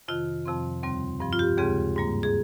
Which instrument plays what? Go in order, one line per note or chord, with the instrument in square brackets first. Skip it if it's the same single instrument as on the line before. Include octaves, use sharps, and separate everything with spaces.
[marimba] F2 C3 D#3 F4
F2 C3 F3 C4
D#2 C#3 G3 C4
G2 F3 C4
F4
G4
D#2 C#3 G#3 C4 G#4
G#2 G3 A#3
G#4